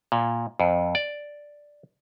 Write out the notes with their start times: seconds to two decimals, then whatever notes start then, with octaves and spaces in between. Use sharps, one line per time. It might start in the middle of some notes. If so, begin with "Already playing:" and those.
0.12 A#2
0.60 F2
0.95 D5